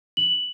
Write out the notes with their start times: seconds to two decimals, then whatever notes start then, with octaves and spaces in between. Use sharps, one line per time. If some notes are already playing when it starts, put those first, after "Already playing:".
0.17 F#7